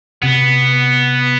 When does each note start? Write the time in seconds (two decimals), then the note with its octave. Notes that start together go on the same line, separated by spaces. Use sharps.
0.23 C3 B3